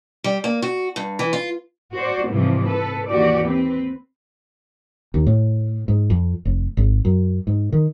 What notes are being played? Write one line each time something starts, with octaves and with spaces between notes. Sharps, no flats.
G3
A#3
F#4
G2
E3
F4
F#4 C5 D5
G#2 C3 E3 F3 G3
A4 B4
D#2 E3 F#4 G4 D5
C4 B4
D#2
A2
G#2
F2
F1
G#1
F#2
G#2
D#3